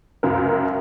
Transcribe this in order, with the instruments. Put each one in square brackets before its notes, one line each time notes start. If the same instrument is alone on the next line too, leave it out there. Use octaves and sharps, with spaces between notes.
[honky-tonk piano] C#2 F#2 A#4